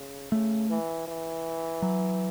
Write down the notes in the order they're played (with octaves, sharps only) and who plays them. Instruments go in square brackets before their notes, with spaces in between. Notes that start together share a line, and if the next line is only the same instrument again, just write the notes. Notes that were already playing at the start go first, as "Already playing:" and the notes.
Already playing: [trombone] C#3
[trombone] C#3 [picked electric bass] A3
[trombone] E3
E3
[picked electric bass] F#3